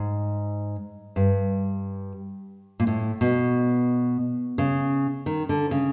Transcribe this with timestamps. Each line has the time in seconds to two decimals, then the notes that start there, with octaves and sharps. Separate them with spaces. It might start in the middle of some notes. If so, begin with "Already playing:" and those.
Already playing: G#2
1.16 G2
2.80 A#2
2.87 A2
3.21 B2
4.58 C#3
5.26 D#3
5.49 D3
5.71 C#3